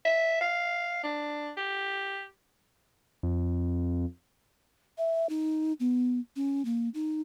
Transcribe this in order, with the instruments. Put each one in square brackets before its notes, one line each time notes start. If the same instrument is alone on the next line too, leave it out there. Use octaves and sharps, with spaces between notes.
[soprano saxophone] E5
F5
D4
G4
[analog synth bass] F2
[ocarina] E5
D#4
B3
C#4
A#3
D#4